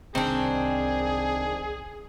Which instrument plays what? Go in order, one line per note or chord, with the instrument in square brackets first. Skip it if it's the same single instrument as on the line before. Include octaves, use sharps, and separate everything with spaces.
[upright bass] C2 [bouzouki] D#3 D4 [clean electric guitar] C4 [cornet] G#4